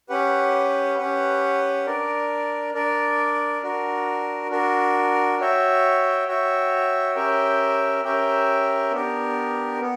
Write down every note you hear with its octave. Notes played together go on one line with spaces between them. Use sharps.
C#4 G4 B4 F#5
C#4 G4 B4 F#5
D4 A#4 D5
D4 A#4 D5
D4 F#4 A#4
D4 F#4 A#4
F#4 C#5 E5 G5
F#4 C#5 E5 G5
C#4 G4 A#4 E5 G5
C#4 G4 A#4 E5 G5
B3 D4 G4 A#4
B3